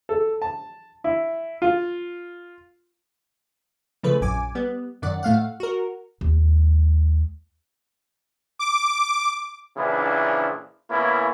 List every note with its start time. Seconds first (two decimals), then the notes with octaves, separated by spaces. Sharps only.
0.09 A4
0.42 A5
1.04 E4
1.62 F4
4.03 C#3 F3 A3 B4
4.21 A#1 F#2 G#5 D6
4.55 G3 B3
5.02 F#2 D#3 D5 F#5
5.23 A2 A3 F5 F#5
5.60 F#4 A#4
6.21 D#2 G#3
8.59 D6
9.77 A#1 C#3 E3 F3 D4 E4
10.90 C#3 A#3 B3 C#4 E4